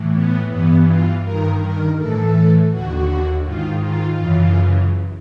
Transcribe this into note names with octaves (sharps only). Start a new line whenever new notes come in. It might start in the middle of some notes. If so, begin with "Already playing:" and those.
Already playing: A2 E3
B3
G2 E3 B3
F4
G2 D#3 A#4
A#4
A2 E3 A4
D#2 D3 F#4
G#2 D#3 F4
F4
F#2 C#3 E3